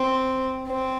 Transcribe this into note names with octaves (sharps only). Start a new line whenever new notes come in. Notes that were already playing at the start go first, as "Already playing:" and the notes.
Already playing: C4
C4